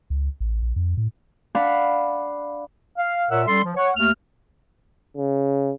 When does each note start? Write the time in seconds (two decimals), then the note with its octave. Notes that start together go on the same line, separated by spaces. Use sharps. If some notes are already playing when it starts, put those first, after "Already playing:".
0.10 C#2
0.40 A1
0.62 A#1
0.76 F2
0.97 A2
1.55 D4 F5 F#5 B5
2.97 F5
3.30 A#2 A#4 C#5 E5 F#5 E6
3.47 G3 C#4 A4 C6
3.63 F3
3.77 C#5 F#5
3.96 D#2 A3 F6
5.17 C#3